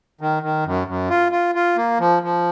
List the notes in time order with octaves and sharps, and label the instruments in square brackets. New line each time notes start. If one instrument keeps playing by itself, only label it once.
[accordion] D#3
D#3
F#2
F#2
F4
F4
F4
A#3
F3
F3